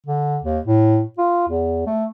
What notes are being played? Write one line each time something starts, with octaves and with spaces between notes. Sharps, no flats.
D3
D#2
A2
F4
E2
A3